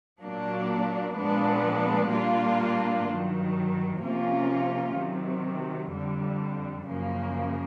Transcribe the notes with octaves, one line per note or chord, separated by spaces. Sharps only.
A#2 F#3 A#3 D4
A#2 F3 G#3 B3 D4
A#2 G3 A#3 D4 F4
G2 D#3 F#3
C3 F3 A#3 C#4 F4
C3 D#3 F#3
F2 D3 G3
F#2 C#3 F3 A#3